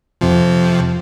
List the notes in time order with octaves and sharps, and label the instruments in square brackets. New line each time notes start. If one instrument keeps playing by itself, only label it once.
[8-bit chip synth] F2 C3 F3